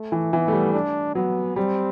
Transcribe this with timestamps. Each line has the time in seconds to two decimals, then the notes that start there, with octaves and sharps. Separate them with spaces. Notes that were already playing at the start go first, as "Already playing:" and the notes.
Already playing: A3
0.12 E3
0.33 E3 B3
0.48 A3
0.53 G3
0.73 D4
1.15 F#3 B3
1.56 G3 C4